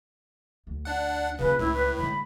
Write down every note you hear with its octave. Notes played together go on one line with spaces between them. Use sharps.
D2
D4 F#5
D#1 C#3 F4 B4
C#2 A2 E4
B4
D3 G#3 B5